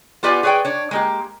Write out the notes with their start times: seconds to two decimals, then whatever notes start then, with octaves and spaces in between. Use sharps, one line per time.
0.23 B3 F4 G4 D5 G#5
0.43 G#4 B4 C#5 D5 G5
0.65 D4 C#5
0.91 G#3 A#3 G4